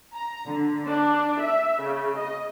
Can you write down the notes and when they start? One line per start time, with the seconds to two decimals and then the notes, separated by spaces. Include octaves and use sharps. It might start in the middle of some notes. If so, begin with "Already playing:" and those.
0.14 A#5
0.48 D3
0.86 D4
1.40 E5
1.82 C#3
2.17 D#5